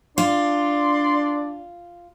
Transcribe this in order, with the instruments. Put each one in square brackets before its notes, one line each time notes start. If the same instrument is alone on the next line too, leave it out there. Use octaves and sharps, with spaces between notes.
[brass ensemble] D4 [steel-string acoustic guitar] F4 [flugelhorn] D5 [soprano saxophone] C6